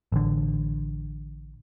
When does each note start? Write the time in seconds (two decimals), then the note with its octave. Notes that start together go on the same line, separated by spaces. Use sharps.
0.12 A1 D3